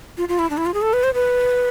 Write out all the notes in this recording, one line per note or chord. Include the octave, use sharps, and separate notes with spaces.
F4
F4
E4
D4
E4
F4
G#4
A4
B4
C5
B4